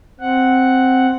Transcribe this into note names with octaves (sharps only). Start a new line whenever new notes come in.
C4 F#5